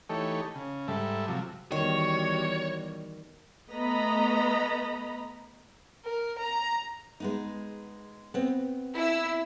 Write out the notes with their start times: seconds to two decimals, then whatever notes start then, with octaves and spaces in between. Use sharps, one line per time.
0.10 E3 A3 D#4 G4 A4 C#5
0.55 C#3
0.88 G#2 G3 A4 E5
1.28 C3 F3 F#3
1.72 E2 D#3 G3 F#4 C#5
3.70 A3 B3 D#5 A#5 B5
6.04 A#4
6.38 A#5
7.20 G#3 B3 D#4
8.34 B3 C4
8.97 E4 E6